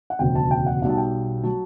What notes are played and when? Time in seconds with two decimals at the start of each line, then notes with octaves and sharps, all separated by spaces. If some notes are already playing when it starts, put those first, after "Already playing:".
0.10 F#5
0.19 E1 D2 C#3 G5
0.35 A5
0.51 G5
0.66 F#5
0.82 B1 B2 G3 F#5
0.90 A5
0.97 G5
1.43 F#3 A5